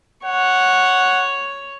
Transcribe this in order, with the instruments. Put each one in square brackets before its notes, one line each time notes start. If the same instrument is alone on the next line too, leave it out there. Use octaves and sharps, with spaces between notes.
[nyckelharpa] C#5 [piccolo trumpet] F#5